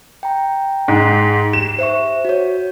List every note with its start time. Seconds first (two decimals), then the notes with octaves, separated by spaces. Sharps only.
0.23 G5 A#5
0.88 G#2
1.53 G4 E7
1.79 C5 E5 C#6
2.25 F#4 C#5